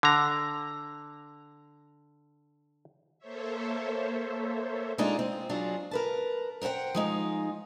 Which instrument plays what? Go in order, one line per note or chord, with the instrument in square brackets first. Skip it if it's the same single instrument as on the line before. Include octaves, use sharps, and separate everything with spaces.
[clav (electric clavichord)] D3 A#5
[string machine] A#3 A4 C5 C#5 E5
[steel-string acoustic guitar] G#3 D4 D#4 F4
C4
F#3 D4 F4 G#4
A#4 B4 A5
A#4 C5 E5 F#5 G5
F3 G#3 D#4